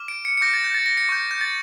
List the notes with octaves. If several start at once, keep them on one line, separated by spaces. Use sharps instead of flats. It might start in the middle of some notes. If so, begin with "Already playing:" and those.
Already playing: D6 F6
D7
C#7
C#7
D6 G6 A#6
A6
G6
A6
A#6
C#7
C#6 G6
G6
A6